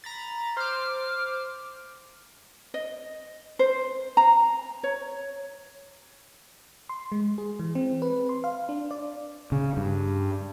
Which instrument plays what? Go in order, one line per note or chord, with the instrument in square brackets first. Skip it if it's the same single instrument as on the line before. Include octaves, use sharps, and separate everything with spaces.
[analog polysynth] A#5 B5 A6
[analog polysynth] C5 D6 [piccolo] F6
[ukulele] D#5
C5
A#5
C#5
[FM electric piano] C6
G#3
G#4
E3
C4
B4
C6
F5
D4
D5
[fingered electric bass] C#3
G2